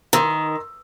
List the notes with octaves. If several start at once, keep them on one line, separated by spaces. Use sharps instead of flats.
D#3 A#5 C6 E6